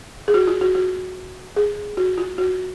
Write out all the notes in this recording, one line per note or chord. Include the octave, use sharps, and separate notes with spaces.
G#4
F#4
F4
F#4
F#4
G#4
F#4
F4
F#4